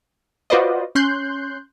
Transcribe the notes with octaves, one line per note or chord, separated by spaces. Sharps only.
F4 F#4 B4 C5 D5 D#5
C#4 C6 F#6 G6